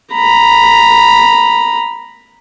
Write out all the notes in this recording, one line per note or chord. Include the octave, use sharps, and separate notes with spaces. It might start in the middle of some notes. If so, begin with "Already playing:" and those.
A#5 B5